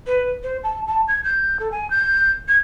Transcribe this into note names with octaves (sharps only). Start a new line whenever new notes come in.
B4
C5
A5
A5
G#6
G6
A4
G#5
G6
G#6